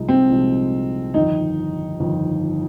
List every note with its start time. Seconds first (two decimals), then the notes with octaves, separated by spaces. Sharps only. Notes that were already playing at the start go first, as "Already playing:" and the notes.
Already playing: C2 A#2 F3 G#3 D#4
0.08 C4
0.29 C2 A#2 F3 G#3 D#4
1.14 G1 F2 D#3 D#4
1.99 G1 F2 D#3